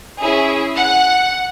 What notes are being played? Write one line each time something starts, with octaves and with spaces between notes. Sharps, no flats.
C#4 E4 G#4
F#5